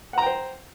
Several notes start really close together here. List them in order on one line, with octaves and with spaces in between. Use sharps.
F#5 A#5 G5 C5